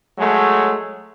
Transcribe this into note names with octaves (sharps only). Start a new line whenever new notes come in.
F#3 G#3 A3